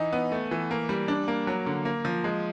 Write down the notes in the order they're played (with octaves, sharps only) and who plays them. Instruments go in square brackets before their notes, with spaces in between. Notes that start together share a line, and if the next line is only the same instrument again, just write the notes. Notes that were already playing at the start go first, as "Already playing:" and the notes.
Already playing: [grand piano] E3 D#4
B3
A3
E3
A#3
G3
D4
A#3
F#3
D3
A#3
F3
G#3